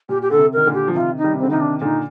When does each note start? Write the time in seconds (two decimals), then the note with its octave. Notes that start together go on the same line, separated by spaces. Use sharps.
0.09 A#2 G4
0.21 G4
0.31 D3 A4
0.38 C3
0.53 D#3 A#4
0.67 A#2 D3
0.74 G4
0.88 F3
0.95 C3 D#3 F4
1.17 D#4
1.24 D#3 G3
1.33 C3
1.39 D3 C4
1.49 C3 D#3 D#4
1.60 D4
1.81 A#2 D3 D#4